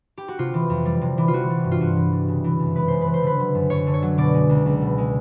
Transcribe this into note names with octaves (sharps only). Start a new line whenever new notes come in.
G4
F#4
C3 F4
E3
F2
G3
C3
E3
F4
E3 F#4
G3
G2
F4
G2 F#4
E3
G3
C#3
E3
F#2
G#3 B4
C#3 C5
B4
E3
C5
D3 B4
F#3
F#2
F#2 C#5
D3
C#5
F#3
B2 D5
G#3
C#2
C#2
B2
G#3